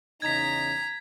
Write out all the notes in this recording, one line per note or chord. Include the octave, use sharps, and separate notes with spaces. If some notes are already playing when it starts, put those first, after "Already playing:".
E2 C#3 D#4 A#5 G#6 B6